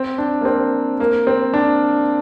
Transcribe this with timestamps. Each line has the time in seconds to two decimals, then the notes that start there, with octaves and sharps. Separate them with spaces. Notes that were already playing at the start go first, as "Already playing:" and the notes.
Already playing: C4
0.18 D4
0.41 A#3
0.45 C4
1.00 A#3
1.27 C4
1.54 D4